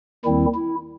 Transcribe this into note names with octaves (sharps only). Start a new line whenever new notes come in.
D#2 D#3 G3 C4 E4
E4